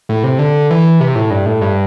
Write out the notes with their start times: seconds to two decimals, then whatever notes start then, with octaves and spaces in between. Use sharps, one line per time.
0.09 A2
0.24 C3
0.39 D3
0.71 E3
1.00 C3
1.15 A2
1.30 G2
1.46 A2
1.61 G2